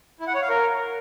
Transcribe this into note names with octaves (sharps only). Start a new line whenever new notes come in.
E4
F#5
C#5
F5
A#4